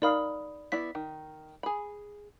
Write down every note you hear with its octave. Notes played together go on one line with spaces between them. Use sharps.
D#4 A#4 D5 F5 B5 D#6
B3 E4 D5 B6
D#3
G#4 B5